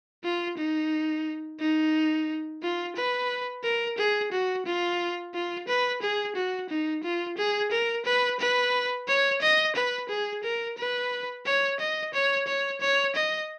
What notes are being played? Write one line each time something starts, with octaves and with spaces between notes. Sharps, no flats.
F4
D#4
D#4
F4
B4
A#4
G#4
F#4
F4
F4
B4
G#4
F#4
D#4
F4
G#4
A#4
B4
B4
C#5
D#5
B4
G#4
A#4
B4
C#5
D#5
C#5
C#5
C#5
D#5